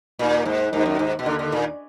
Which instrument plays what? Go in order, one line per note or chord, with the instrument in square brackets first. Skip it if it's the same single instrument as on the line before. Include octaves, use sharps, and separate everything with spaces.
[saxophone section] D#2 D#3 A#3 D#4 [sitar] A#2
[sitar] G#2
[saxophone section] D#2 D#3 A#3 D#4 [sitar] G#2
[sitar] F#2
G#2
B2
[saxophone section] D#2 D#3 A#3 D#4 [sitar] D3
[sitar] D3
A#2